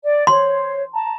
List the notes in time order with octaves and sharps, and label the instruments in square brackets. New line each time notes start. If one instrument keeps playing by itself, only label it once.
[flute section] D5
[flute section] C5 C#5 [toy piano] C6
[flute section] A5 A#5